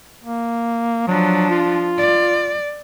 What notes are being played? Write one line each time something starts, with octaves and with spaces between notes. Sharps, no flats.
A#3
F3 F#3 D4
F4
D5